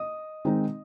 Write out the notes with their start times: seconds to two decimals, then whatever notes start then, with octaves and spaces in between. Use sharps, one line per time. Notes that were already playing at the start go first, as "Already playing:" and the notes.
Already playing: D#5 D#6
0.45 D#3 G#3 C4 D#4